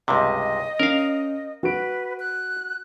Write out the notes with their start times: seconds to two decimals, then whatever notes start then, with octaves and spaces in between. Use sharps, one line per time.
0.08 C#2 G2 C3 D#5
0.79 C#4 A#4 F5
1.63 F#4 B4 D7
2.20 F#6